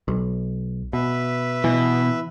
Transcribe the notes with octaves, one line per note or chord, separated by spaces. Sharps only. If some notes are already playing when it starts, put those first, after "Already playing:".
B1
B2 B4 E5
B2 E3